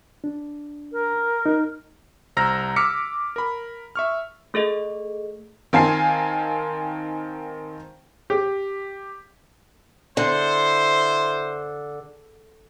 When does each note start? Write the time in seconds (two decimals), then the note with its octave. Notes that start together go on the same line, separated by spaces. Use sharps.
0.24 D4
0.92 A#4
1.46 D#4
2.37 C2 C5 A#5 E6 F6 A#6
2.76 D6 E6 F6 B6 C#7
3.36 A#4 B5
3.96 E5 C#6 F6
4.54 A3 G#4 A4 D#5
5.73 D#3 C4 F5 G#5 A5 C7
8.30 G4
10.17 D3 E4 C5